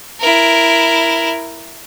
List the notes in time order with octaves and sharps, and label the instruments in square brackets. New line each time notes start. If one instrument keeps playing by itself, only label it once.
[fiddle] E4 A#4